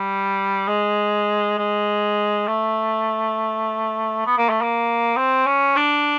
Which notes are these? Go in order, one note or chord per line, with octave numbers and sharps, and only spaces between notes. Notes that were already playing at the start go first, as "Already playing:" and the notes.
Already playing: G3
G#3
G#3
A3
B3
A#3
A3
A#3
C4
C#4
D4